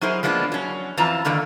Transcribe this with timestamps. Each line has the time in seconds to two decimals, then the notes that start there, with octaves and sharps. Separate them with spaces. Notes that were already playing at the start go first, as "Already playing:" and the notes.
0.01 F#3 D#4 E4 G#4 A#4 C5
0.23 F3 G#3 A#3 B3 D4
0.52 F#3 C#4
0.97 F2 E3 F4 A5 A#5
1.25 G2 D3 D#3 A#3